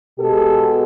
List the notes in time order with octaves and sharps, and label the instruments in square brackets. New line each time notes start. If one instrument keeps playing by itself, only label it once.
[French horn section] B2 G#3 G4 A4